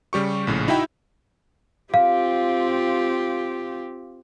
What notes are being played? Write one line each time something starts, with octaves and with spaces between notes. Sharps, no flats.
C#3 G3 G4 C#6
A#1 A2 C#3
D#4 E4 F#4 E5 G5 B5
C4 F4 G4 F5